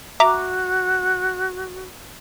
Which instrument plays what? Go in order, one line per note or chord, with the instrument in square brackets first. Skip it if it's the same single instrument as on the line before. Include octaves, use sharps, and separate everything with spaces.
[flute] F#4 [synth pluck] E5 A#5 D6